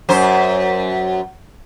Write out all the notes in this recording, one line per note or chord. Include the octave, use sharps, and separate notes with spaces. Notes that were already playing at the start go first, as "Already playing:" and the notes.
F#2 C5